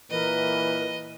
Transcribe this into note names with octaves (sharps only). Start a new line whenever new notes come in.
A#2 E3 A#4 B4 D#5